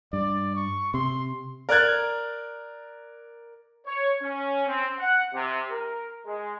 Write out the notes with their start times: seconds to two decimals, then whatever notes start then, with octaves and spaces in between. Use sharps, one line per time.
0.13 G2 D5
0.56 C#6
0.94 C3 C6
1.69 A#4 D5 A#5 F#6 G#6 A6
3.86 C#5
4.22 C#4
4.68 C4
4.99 F#5
5.34 C3
5.71 A#4
6.26 G#3